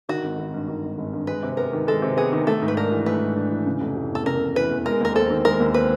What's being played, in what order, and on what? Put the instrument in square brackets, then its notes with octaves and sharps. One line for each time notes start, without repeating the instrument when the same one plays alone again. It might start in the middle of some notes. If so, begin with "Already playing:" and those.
[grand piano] D#3 [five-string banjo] F#4
[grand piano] G#1
G#1
G2
D#3
G#1
G#1
G2
[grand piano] G#3 [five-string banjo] B4
[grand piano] C3
[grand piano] B3 [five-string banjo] A#4
[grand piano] D#3
[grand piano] G#3 [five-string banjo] A4
[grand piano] C3
[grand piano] B3 [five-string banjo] G#4
[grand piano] D#3
[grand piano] A3 [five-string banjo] A4
[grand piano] G#2
[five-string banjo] B4
[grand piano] D4 [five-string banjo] A#4
[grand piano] E3
[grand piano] A3 [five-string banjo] B4
[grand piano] G#2
D4
E3
C#3
F1
E3
[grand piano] E2 [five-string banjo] A4
[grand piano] C#3 [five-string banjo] A#4
[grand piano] F1
[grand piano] E3 [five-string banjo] B4
[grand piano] E2
[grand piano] G#3 [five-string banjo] A#4
[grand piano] D#2 [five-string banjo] A#4
[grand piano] C4 [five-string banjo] A4
[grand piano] D#3
[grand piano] G#3 [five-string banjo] A#4
[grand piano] D#2
[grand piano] C4 [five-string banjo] B4